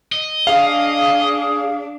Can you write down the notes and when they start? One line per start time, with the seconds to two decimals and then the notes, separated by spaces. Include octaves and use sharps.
0.12 D#5
0.47 D4 G#4 F5